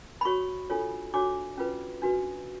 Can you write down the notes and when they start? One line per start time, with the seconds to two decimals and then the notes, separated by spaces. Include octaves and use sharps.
0.21 B5
0.25 F#4 C#5 C#6
0.70 D4 F4 A4 C#5
1.14 D4 F#4 C#5 D6
1.58 C#4 F4 B4
2.02 D4 F#4 B4